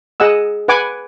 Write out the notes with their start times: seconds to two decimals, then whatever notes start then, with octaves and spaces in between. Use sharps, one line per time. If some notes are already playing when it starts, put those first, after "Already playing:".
0.20 G#4 D#5 F#5 E6
0.68 B4 F#5 G#5 D6